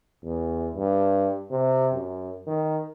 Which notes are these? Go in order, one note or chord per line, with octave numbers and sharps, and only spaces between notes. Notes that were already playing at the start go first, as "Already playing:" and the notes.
E2
G2
C3
F#2
D#3